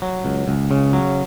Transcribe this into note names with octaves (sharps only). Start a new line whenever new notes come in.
F#3
C#2
C#2
C#3
F#3